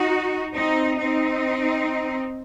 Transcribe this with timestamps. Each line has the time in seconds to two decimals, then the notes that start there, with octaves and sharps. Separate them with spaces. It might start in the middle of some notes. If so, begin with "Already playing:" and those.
Already playing: D#4 F#4
0.54 C4 D#4
0.98 C4 D#4